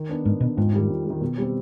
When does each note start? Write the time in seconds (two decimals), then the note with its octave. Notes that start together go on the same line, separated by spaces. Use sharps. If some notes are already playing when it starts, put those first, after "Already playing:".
Already playing: D#3
0.09 B3 D4
0.25 G#2 D#3
0.41 B2 B3 D4
0.57 F2 G#2
0.73 D#3 G3
0.90 F2
1.05 G3
1.10 D#3
1.21 B2
1.38 G3 C4